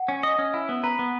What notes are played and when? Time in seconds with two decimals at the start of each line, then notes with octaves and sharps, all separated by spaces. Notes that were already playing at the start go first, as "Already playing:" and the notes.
Already playing: F#5
0.08 C#4
0.23 D#5
0.39 C#4
0.54 E4 G#5
0.69 B3
0.83 B4 A#5
0.99 B3